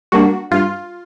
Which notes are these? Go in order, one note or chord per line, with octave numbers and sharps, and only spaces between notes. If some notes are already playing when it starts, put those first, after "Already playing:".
G3 A#3 D4 F#4
G2 F4